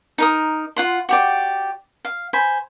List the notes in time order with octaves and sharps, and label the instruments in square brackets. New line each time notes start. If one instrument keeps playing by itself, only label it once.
[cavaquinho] D#4 A#4 D#6
F4 F#5 C6
F#4 G4 D5
F5
C5 G#5 B5